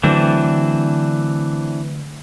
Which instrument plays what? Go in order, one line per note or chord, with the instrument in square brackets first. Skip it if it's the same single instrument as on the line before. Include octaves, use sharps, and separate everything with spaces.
[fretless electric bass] D3 F#3 A3 [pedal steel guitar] E3 C4 D4